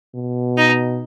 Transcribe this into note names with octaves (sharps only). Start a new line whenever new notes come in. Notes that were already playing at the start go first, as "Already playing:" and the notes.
B2
D#4